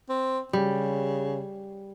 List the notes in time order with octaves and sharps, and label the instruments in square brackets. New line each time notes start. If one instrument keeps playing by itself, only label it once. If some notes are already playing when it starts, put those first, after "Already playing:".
[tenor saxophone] C4
[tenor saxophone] C#3 [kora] G3